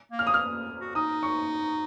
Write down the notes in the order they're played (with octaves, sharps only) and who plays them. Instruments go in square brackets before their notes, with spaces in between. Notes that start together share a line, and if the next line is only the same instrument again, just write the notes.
[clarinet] A#3
[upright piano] F6
D#6
F6
[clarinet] F#4
[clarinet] D#4 [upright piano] D#6
[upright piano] C#6